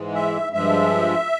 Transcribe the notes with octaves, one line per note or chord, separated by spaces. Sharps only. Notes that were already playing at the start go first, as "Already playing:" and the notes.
Already playing: G#2 E3 G#3
E5
G2 F3 G#3 E5